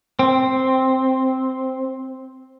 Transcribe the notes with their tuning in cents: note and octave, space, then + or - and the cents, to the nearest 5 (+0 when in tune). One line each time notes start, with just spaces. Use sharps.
C4 +0